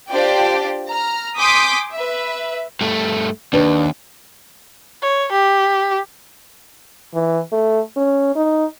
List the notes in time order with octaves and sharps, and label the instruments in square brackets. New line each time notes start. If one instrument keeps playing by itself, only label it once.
[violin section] D4 F4 G4 C5 D5 G5
A#5 F6
G#5 C6 D6 D#6 G6 B6
B4 E5
[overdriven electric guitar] G2 A3
[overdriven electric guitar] D#2 [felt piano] D4 B4
[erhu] C#5
G4
[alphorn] E3
A3
C#4
D#4